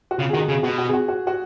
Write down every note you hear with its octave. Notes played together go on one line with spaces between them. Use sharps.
F#4
C#3 F4
G#4
D#3 F#4
C#3 G#4
B2 F#4
F#4
G#4
F#4
F#4
F#4